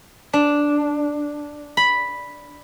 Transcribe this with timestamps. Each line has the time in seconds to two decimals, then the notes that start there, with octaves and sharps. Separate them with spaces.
0.33 D4
1.77 B5